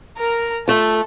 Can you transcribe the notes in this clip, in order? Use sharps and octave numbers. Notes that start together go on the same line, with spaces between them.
A#4 A#5
A3 F4 A4